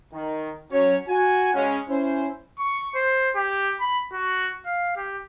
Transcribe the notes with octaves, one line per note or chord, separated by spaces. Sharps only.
D#3
F#3 C#4 C#5
F#4 G#5
C#3 G#3 C#4
C#4 E4 C5
C#6
C5
G4
B5
F#4
F5
G4